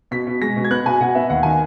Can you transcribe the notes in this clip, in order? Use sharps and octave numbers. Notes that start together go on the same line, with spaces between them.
B2 B6
B2
G#3 A#6
B2
G#6
B3 F#6
B2 G#5
B2 F#5
B3 E5
D#2 F#5
D#3 G#5